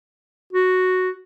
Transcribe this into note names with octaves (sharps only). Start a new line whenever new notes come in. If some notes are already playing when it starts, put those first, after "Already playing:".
F#4